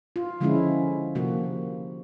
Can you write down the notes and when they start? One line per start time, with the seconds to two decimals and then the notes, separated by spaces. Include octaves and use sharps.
0.16 F4
0.40 D3 F3 G#3 C#4 E4
1.15 C3 F3 A#3 F#4